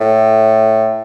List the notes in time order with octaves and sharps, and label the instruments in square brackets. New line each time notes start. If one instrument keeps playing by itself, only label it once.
[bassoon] A2